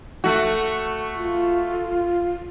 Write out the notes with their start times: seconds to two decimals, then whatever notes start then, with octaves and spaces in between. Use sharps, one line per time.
0.24 A3 F#4
1.16 F4